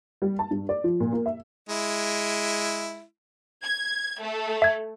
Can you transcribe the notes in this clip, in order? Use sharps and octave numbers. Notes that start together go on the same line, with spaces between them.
G3
A5
G2
D5
F3
A#2
A#3
E5
G#3 E4
G#6
A3
E5 G#6